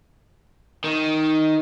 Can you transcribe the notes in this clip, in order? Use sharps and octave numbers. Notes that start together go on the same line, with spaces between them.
D#3